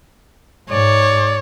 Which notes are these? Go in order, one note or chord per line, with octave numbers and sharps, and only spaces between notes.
G#2 C#5 D5